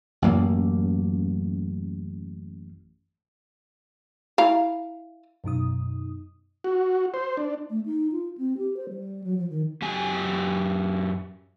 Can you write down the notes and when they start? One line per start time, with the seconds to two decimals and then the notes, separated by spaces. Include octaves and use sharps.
0.22 A1 F#2 A#3
4.38 E4 F5 A#5
5.44 F#2 B2 D#4 D#6
6.64 F#4
7.14 C5
7.37 D4
7.69 A3
7.86 D#4
8.12 F4
8.38 C4
8.58 G4
8.77 C5
8.89 G3
9.24 F#3
9.38 F3
9.50 D#3
9.82 F#2 G4 G#5